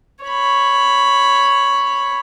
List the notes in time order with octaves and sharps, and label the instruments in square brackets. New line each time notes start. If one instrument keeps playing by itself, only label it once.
[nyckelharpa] C#5 B5